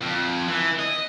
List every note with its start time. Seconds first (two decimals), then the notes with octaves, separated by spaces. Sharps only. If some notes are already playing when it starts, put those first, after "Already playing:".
0.02 F2
0.49 E3
0.79 D#5